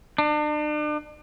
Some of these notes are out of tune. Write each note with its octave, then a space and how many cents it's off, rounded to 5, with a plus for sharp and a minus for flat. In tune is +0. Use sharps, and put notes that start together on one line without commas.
D4 +40